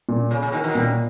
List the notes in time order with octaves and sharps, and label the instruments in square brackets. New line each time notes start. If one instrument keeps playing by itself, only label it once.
[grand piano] A#2
[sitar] C#3
C#3
B2 D#3
B2 D#3
[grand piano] A#2